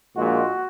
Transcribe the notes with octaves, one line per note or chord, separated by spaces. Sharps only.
A#1 A#2 G#3 F#4